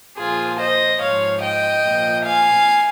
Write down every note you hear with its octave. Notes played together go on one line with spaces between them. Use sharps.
A#2 F3 F4 G#4
C5 D#5
G#2 F3 C#5 F5
D#5 G5
A#2 F3
F5 G#5